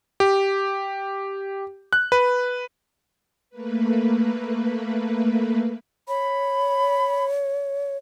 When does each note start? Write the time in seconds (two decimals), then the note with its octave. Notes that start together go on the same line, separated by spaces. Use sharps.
0.20 G4
1.93 F#6
2.12 B4
3.50 A3 A#3 B4
6.08 C#5 B5